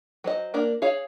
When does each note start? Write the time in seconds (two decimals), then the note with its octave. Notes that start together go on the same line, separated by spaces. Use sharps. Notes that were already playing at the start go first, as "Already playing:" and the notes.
0.24 F#3 C5 D#5
0.54 A#3 D4 A#4
0.82 G#4 C#5 F5